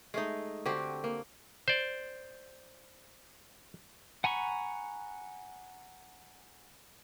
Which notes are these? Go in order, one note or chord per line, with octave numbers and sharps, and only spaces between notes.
G#3 A3 D#4
D3 C4 F#4 G4
A#3
C5 D5
F#5 G#5 A#5 B5 C#6